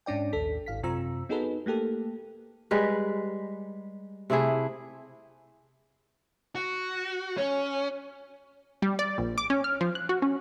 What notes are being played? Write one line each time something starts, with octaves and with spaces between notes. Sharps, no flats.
G#2 C#4 D4 D5 G5
A#1 D#2 A4 B6
G#1 F5 B6
F#2 C3 C4 F4 A#5 E6
B3 D#4 F#4 G#4 A4 B4
A3 A#3 G4 A4
G3 G#3 B4
C3 A3 E4 G#4
F#4
C#4
G3
D5
A#1
D6
C#4
F6
F3
F#6
F#4
C#4